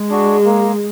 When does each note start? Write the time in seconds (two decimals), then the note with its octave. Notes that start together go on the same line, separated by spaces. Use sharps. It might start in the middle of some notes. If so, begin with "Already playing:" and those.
Already playing: G#3
0.10 D4 F#4
0.45 A#3